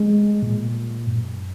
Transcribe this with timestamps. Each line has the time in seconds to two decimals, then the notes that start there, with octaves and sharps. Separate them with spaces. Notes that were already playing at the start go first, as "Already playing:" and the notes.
Already playing: G#3
0.43 A#2
1.07 F#2